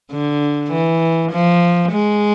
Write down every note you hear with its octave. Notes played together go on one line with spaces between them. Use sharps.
D3
E3
F3
G#3